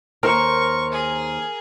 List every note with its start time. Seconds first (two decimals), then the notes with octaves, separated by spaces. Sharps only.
0.23 D#2 A#4 C5 C#6
0.92 G#4